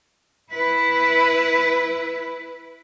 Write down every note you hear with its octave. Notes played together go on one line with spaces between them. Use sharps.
E4 B4